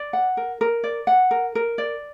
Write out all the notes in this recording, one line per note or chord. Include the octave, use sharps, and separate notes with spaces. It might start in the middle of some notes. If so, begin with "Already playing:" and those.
Already playing: D5
F#5
A#4
A#4
D5
F#5
A#4
A#4
D5